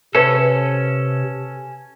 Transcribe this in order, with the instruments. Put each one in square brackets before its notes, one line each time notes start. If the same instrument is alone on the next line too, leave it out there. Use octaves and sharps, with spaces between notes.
[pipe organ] C3 [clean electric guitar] C#4 A4 [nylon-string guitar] B4 C5 E5